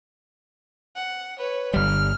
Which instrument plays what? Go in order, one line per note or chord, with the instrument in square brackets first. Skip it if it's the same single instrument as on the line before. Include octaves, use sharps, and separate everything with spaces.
[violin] F#5
B4 C#5
[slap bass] G1 G3 [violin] F6